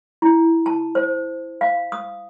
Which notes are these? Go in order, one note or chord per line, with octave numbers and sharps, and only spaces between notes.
E4
A5
C5
F5
D#6